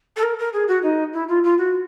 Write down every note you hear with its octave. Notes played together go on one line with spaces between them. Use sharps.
A4
A#4
A#4
G#4
F#4
D#4
E4
F4
F4
F#4